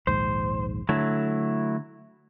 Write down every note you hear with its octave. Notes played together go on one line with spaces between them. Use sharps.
A#1 D#2 G#2 C5
D3 F#3 A3 E4